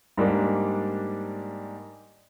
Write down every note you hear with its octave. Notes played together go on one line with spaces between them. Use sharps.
G#2 G3 A#3 D4